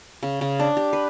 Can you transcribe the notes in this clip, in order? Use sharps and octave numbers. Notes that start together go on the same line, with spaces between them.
C#3
C#3
D4
G4
B4